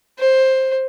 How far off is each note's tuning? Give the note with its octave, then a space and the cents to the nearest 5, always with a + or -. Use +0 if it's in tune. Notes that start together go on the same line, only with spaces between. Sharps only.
C5 +10